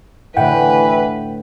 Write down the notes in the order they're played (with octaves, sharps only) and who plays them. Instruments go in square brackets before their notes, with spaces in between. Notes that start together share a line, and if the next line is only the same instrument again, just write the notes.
[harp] A2 D3 [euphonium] E3 [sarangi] B4 [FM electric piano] F#5 G5